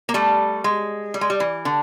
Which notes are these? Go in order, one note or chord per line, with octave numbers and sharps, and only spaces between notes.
A#3
G3 A3
G#3
G3
G#3
G3
E3
D3